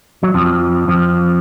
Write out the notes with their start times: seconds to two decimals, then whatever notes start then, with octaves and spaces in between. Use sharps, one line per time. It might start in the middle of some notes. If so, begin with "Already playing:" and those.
0.23 F#3
0.34 F2 F3
0.88 F2 F3